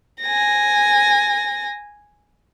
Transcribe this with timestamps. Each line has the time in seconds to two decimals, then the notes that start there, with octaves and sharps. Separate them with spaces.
0.22 G#5 A#6